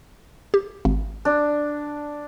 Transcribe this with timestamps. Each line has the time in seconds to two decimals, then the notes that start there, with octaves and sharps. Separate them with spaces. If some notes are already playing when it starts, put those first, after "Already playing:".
0.54 G4
0.85 G#1
1.25 D4